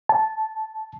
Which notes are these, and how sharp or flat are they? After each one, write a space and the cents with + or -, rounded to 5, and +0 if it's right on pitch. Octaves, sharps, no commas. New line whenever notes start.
A5 -15